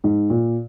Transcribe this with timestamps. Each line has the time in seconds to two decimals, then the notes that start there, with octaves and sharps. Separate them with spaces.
0.04 G#2
0.30 A#2